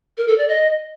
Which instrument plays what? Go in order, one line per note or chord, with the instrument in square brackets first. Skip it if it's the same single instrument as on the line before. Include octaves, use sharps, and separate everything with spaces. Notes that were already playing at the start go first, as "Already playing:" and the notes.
[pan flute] A#4
A4
D5
D#5